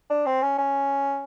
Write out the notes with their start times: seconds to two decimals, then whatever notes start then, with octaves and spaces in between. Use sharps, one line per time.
0.10 D4
0.26 C4
0.42 C#4
0.58 C#4